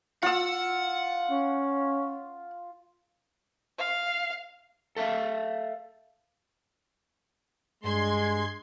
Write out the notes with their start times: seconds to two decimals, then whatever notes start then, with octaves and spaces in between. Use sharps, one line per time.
0.23 F4 F#5 E6
1.31 C#4
3.78 F5
4.97 A4 E5 F5
7.84 G2 G#3 C6 G#6